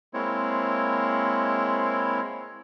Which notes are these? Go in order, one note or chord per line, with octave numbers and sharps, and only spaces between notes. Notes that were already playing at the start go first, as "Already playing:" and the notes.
G#3 A#3 C4 E4 C#5